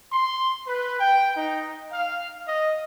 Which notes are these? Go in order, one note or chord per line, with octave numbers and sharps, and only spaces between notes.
C6
B4
G5
D#4
F5
D#5